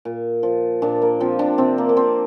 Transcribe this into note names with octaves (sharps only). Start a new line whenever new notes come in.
A#2
F3
A#2 D4
A#3
F3 C4
D4
C3 C4
A#3
A#3
F3 C4